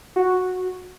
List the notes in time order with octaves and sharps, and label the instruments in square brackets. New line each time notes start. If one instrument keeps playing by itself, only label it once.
[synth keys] F#4